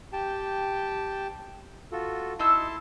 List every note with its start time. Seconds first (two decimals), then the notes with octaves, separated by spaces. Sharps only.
0.13 G4 G5 A5
1.92 F4 F#4 A4
2.39 D#4 E4 A5 C6 E6